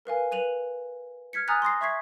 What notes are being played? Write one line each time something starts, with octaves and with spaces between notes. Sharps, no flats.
A#4 B4 F5 G#5
B4 D#7 F7 F#7
F6 G#6 B6 C#7
G#5 A#5 D#6 F6 F#6 A6
C6 D#6 A#6 C7
E5 C#6 G#6 B6 C7